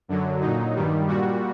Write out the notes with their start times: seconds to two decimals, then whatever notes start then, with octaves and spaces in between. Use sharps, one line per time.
0.08 F#2 D3 F#3
0.41 A#2 F#3 D#4
0.75 G2 D#3 G3
1.08 A#2 G3 F#4